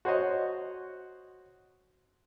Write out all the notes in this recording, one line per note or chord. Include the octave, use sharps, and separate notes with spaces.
F#4 C5 C#5 D#5